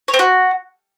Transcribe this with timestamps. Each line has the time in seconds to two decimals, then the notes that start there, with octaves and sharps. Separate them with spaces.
0.08 C#5
0.14 C4
0.19 F#4